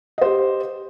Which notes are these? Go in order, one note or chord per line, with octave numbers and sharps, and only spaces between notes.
G4 C5 D#5